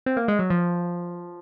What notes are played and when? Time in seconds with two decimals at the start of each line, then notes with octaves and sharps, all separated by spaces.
0.06 C4
0.17 A#3
0.28 G#3
0.39 F#3
0.50 F3